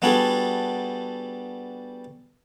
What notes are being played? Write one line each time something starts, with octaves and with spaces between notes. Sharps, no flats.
G3 B3 D4 F#4 G#4 A4